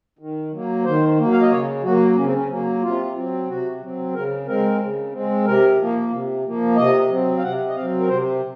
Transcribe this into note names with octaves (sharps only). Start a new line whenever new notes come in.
D#3
F#3 A#3
D#3 C5
F#3 A#3
F5
D#5
C#3 C#5
F#3 A#3 F#4
C#3 C#4
C4
C#4
F#3 A#3
C3 F4
F#3 C4
C3 F#4
F#3 C4
C#3 A#4
G#3 C4 A#4
C#3
G#3 C4
C3 A#4
F3 A#3
C3
F3 A#3
C3 D#5
F#3 C4
F5
C3 F#5
D#5
F#3 C4 F5
A#4
C3 C5